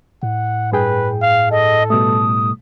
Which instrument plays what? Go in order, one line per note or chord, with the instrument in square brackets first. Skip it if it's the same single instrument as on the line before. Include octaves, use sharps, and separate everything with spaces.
[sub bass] A2 [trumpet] F#5
[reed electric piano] G2 G#4 G5 [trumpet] B4
[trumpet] F5
[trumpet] A4 [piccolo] D#5
[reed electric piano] B2 G3 A3 [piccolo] D#6